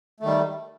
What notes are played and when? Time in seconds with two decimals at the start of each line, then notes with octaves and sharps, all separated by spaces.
0.20 A3
0.23 D#3
0.26 G3